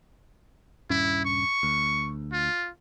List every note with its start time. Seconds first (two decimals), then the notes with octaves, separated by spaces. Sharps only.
0.90 D#1 G2 C#4 E4
1.25 C#6
1.63 D2
2.33 F4